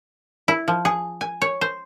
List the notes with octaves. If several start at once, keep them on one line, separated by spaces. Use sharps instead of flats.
E4
F3
G#4
G#5
C#5
C5